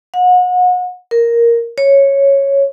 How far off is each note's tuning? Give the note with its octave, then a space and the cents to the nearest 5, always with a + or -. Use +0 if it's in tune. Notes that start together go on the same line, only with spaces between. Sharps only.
F#5 -35
A#4 +0
C#5 -5